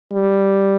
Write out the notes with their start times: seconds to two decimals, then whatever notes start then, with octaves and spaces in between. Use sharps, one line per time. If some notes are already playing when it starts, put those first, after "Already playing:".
0.12 G3